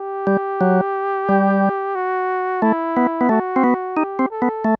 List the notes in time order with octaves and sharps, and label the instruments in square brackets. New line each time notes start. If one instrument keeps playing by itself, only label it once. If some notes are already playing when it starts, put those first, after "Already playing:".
Already playing: [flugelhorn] G4
[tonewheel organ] G3
F#3
G3
[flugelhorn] F#4
[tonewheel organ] A3 [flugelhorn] E4
[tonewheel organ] B3
B3
[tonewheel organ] A3 [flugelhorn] F#4
[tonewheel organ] C4
B3
[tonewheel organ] D#4 [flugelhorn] G4
[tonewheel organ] C4
[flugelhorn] A4
[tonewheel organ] B3
A3